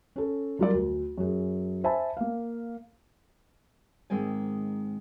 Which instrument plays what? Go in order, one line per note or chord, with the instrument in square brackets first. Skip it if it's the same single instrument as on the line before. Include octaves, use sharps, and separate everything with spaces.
[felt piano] C#4 A4
F#3 G3 F4 A#4 D5
D2
F#2 G#4
C5 E5 G#5 A5 B5
A#3 F5
[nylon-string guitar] G#2 D#3 G#3 A#3 C4 G#5